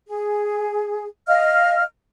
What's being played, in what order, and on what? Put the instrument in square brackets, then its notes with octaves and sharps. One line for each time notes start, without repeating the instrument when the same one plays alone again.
[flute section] G#4
D#5 F5 F6